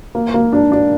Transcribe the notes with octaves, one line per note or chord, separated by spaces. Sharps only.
A#3
A#3
D4
D4